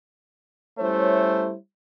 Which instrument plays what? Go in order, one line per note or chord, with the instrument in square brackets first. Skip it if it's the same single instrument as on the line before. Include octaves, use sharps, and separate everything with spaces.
[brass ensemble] G3 A3 C#4 E4 C5 C#5